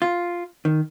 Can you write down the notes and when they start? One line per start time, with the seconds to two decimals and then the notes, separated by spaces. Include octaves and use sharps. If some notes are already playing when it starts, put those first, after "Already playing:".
0.02 F4
0.65 D#3